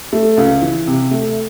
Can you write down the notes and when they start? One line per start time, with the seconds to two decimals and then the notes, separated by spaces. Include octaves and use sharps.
0.13 A3
0.37 C#2
0.62 E3
0.87 C3
1.11 A3